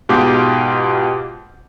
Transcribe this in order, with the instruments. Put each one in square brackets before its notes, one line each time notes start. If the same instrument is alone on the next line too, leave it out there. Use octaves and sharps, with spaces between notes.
[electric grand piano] G#2 B2 F4 G4 D6 G6